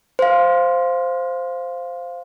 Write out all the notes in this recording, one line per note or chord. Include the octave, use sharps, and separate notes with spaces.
C5 F5